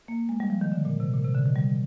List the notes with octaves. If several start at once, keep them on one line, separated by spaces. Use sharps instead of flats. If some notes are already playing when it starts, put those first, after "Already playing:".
A#3
G#3
G3
F3
D#3
D3
A#2
C3
A#2
C3
D3
D#3
G3